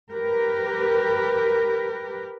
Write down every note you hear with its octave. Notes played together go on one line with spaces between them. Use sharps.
G4 A#4 B4